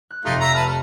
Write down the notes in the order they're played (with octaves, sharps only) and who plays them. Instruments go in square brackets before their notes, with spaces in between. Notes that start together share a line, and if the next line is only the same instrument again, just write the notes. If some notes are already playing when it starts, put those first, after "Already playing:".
[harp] F#6
[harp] F1 G4 [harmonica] A3 D#4 F4
[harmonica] E5 A#5
[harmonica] B4 A5 [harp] F6
[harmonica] A3 [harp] F6